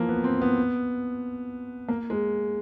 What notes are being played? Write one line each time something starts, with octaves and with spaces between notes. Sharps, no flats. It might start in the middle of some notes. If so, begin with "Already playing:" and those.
Already playing: E3 F3 A#3
B3
C4
B3
A#3
G#3